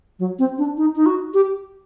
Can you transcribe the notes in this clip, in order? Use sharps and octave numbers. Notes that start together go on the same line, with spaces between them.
F#3
C4
D4
D#4
D#4
F#4
G4